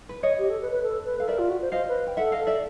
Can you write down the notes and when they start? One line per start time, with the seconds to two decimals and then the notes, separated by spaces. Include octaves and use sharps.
0.09 B4
0.23 C#5 D#5
0.38 G4
0.50 A4
0.61 B4
0.71 B4
0.83 A4
1.05 B4
1.20 A4 F5
1.27 A#4 D5 E5
1.38 F4
1.50 F#4
1.62 C5
1.72 C5 D#5 F5
1.88 B4
2.07 G5
2.17 A4 E5 F#5
2.32 D#5 F5
2.40 A4
2.47 D5 E5